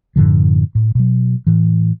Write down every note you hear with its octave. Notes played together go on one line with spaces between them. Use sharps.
F#2 A2 D3 F3
A2
B2 F#3
A2 E3